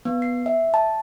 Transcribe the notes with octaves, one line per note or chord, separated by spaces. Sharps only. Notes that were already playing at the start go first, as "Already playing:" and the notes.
B3
C7
E5
A5